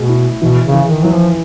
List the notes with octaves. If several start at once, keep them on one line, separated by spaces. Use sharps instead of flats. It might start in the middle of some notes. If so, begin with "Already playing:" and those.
Already playing: B2 A3 G#4
E4
B2 E3
C#3
E3
D#3
E3 F#3
F3